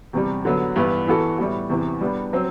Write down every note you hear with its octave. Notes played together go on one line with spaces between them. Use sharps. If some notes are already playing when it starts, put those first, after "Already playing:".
E2 C3 G3
D3 F#3 B3
G2 E3 B3 E4 B4
E3 B3 F#4 A4
A2 G3 B3 F#4
E2 C3 E3
G3 B3 D4
F#3 C4